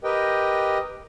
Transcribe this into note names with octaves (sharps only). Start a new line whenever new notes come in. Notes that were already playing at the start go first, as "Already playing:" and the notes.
G4 A#4 B4 D#5 G5